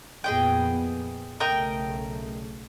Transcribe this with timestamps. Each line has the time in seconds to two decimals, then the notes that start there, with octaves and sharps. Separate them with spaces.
0.24 F2 A#2 B3 G#4 D#5 G5
1.40 B1 C#3 A3 A#4 D#5 G5